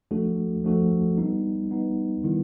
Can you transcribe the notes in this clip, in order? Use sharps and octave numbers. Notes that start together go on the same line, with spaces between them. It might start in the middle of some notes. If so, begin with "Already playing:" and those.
F3 A3 D4 F#4 A4
F3 A3 D4 F#4 A4
G3 B3 D#4
G3 B3 D#4
D#3 G3 B3 E4